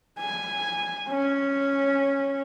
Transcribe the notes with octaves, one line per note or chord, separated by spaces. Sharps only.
G#5
C#4